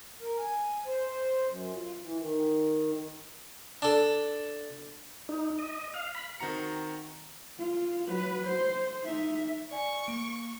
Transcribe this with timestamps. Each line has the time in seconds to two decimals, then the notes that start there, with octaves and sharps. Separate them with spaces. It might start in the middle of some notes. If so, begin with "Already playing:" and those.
0.21 A#4
0.39 G#5
0.86 C5
1.47 F#2
1.74 F4
2.02 E3
2.19 D#3
3.82 D4 A4
5.29 D#4
5.59 D#5
5.94 F5
6.15 B5
6.40 D#3 C4 F#4 A#5 C#7
7.58 F4
8.07 F#3 B4
8.46 C5
9.04 D#4 E5
9.71 D5 G#5 C#6
10.08 A#3 D7